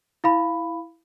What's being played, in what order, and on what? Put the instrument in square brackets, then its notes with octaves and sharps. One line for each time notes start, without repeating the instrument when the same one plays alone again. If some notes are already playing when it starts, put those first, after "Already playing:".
[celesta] E4 F5 B5